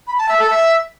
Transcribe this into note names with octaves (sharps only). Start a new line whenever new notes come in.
B5
A5
E5
A4
E5